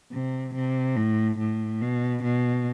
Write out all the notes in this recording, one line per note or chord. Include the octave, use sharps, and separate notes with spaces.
C3
C3
A2
A2
B2
B2